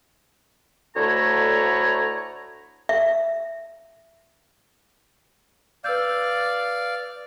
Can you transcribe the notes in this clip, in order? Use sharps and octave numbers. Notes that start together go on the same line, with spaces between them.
D2 D3 A3 E4 C#5 A#5
E5
B4 D5 F5 E6 G6